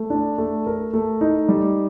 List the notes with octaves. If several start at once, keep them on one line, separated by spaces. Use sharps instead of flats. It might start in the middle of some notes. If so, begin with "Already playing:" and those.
Already playing: A3
D4
A3
A#4
A3
D#4
G3